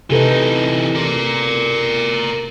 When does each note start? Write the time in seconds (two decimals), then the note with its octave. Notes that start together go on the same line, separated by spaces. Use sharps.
0.10 C3 E3 D#4 A4 B4
0.95 A#4 D5